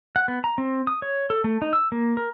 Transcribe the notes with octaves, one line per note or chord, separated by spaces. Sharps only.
F#5
B3
A#5
C4
D#6
C#5
A4
A3
D#4
E6
A#3
A#4